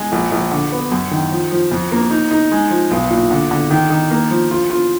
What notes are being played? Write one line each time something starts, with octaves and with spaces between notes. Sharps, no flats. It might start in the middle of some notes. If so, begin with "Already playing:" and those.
Already playing: G#3
A#1
A#1
D3
B3
F#2
D#3
F3
F3
F2
A#3
D#4
D#4
G#3
F3
B1
A#2
D3
D3
D#3
D#3
A#3
F3
F4
F4